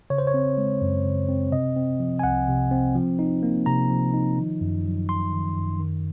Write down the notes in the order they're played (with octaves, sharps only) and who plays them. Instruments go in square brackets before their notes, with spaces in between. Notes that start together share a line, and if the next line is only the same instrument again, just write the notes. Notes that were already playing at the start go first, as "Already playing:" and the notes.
[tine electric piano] C#3 C#5
C5
C#5
C4
G#3
F#2
C#3
C4
C3 D#5
C4
F3
G#5
C2 F#5
C3
C4
F3
D#4
A#3
C3 A#5
F3
D#4
D#3
F#2
F#3
F#2 C6
D#3
F#2
D#3